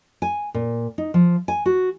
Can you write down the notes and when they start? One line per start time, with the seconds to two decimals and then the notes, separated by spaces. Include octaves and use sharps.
0.22 G#5
0.54 A#2
0.98 D#4
1.14 F3
1.48 G#5
1.66 F#4